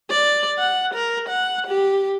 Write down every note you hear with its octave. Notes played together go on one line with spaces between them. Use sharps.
D5
F#5
A#4
F#5
G4